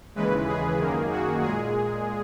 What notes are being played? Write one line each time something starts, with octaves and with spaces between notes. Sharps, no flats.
D#2 C#3 E3 G#3 B4
G#4
F#2 D#3 A#3
F#4
A#2 G#3 G#4